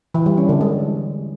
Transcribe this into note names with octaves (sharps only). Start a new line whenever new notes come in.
E3
G3
C#4
D3
G#3